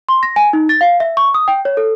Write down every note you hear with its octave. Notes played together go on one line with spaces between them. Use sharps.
C6
A#6
G#5
D#4
A6
F5
E5
C#6
D#6
G5
C#5
A4